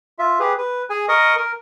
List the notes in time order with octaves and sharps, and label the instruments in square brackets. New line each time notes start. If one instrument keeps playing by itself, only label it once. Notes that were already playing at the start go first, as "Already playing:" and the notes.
[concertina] F4 E5
G4 G#4 B4
B4
G#4 G#5
A#4 D#5 C#6 D#6
A#4